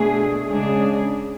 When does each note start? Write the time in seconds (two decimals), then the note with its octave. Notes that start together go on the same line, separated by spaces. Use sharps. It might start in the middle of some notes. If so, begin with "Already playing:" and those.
Already playing: B2 A3 D4 G#4
0.49 C#3 G#3 D4 G#4